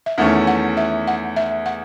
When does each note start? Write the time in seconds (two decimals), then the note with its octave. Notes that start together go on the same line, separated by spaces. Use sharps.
0.06 E5
0.18 E2 D#3 A3 C#4 F#5
0.47 F#5
0.77 E5
1.08 F#5
1.36 E5
1.66 F#5